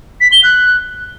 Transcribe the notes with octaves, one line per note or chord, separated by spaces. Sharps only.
B6
G7
F#6